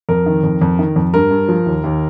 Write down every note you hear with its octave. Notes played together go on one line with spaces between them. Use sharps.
F2 A#4
D#3
F2
F2
D#3
F2
G2 A#4
G2
F3
D#2
D#2